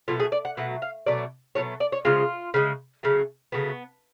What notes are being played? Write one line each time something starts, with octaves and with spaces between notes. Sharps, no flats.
B2 F#3 A3 F4
G#4
D5
F#5
B2 F#3 A3 F#5
F5
B2 F#3 A3 D5
B2 F#3 A3 C#5
D5
C#5
C#3 F3 G#3 F4
C#3 F3 G#3
C#3 F#3 A3
C#3 F#3 A3 B3